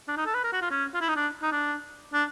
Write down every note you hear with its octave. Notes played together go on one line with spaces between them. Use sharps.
D4
D#4
A4
B4
A#4
F#4
F4
C#4
F4
E4
D#4
D4
D#4
D4
D4